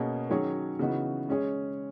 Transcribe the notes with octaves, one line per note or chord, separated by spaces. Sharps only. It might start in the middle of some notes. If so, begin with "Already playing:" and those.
Already playing: B2 A#3 C#4 G#4
D#3 F#3 C#4 G#4 C#5
C#3 E3 B3 D#4 F#4
G#3 C#4 G#4 C#5